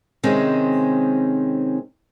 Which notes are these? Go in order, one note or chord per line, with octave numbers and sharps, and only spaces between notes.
C3 D#3 G#3 C4 C#4